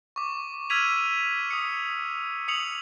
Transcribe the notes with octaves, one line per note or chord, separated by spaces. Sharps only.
C#6 D6
E6 F6 G#6 B6 D#7 F7
D#6 C#7
D#6 C#7 F7 F#7